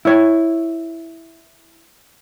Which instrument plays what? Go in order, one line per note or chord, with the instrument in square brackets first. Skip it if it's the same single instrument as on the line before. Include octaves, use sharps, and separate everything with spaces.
[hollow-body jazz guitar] E4 C#5